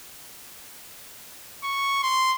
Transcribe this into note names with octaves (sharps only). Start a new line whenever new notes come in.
C#6
C6